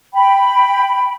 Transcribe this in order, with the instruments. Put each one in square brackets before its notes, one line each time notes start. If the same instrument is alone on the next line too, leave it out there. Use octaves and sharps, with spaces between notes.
[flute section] G5 B5